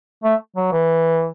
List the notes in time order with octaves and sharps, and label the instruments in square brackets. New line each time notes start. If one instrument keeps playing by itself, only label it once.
[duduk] A3
F#3
E3